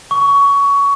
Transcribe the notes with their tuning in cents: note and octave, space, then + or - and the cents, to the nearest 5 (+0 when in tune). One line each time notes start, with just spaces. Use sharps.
C#6 +20